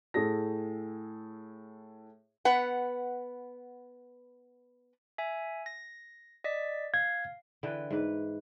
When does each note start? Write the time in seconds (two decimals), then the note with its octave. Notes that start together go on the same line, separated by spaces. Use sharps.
0.14 A2 G#4 A4 A#6
2.45 B3 B4 F#5
5.18 E5 G#5
5.66 A#6
6.44 D5 D#5 B6
6.94 F5 G#6
7.63 D3 E3 B4 G5
7.90 G#2 B4